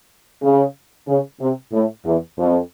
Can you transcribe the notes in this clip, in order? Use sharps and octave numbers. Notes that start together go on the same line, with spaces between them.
C#3
C#3
C3
A2
E2
F2